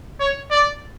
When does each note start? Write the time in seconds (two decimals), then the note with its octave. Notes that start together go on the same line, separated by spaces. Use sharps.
0.20 C#5
0.51 D5